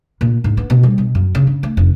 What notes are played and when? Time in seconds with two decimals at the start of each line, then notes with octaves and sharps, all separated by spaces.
0.21 A#2
0.44 G#2
0.57 B3
0.70 B2
0.83 G3
0.98 B2
1.15 F#2
1.35 C#3
1.47 C#3
1.63 A3
1.77 F1